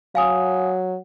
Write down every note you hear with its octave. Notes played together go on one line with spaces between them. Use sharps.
F#3 F5 G#5 D#6